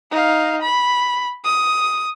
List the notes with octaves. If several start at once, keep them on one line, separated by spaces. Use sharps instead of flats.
D#4 F5
B5
D#6